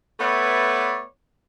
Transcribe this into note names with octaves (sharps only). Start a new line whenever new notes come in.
A3 B3 B4 C#5 D5 E5